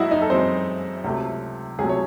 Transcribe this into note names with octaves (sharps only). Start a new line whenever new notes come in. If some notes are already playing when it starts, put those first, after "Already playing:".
Already playing: F#2 G#3 E4 F#4 D#5 E5
D#4 D#5
A4
F#2 E3 G#3 C4 C5
C#2 C3 F#3 A3
C#2 C3 F#3 A3 G#4
C#5